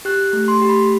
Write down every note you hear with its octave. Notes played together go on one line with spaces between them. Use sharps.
G4 F#6
A3
C6
G4
B5